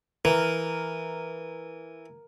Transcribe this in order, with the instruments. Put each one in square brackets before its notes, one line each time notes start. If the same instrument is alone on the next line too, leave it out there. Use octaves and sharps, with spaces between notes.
[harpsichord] E3 [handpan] A#4